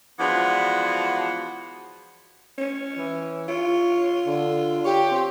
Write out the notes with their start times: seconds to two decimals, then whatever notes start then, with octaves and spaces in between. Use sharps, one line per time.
0.19 E3 F3 G#3 B3 D4 F#4
2.58 C#4
2.98 E3
3.48 F4 C#5
4.27 D3
4.85 G4 C#5
5.11 C4